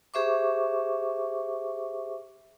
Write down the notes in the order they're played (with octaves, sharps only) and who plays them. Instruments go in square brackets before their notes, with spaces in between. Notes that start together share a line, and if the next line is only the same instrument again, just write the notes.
[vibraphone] G4 G#4 C5 E5 C#6 D6